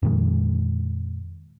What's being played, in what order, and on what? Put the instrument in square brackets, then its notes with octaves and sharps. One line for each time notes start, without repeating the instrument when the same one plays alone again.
[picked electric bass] F2 A#2 D#3 G#3